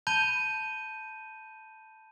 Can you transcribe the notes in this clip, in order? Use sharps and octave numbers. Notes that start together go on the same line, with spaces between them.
A5 B5 G6 D#7 G7